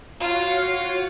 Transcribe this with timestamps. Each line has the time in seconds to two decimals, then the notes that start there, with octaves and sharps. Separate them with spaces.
0.20 F4 F#4 C#5 F5